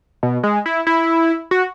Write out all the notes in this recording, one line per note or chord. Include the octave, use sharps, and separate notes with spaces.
B2
G#3
E4
E4
F#4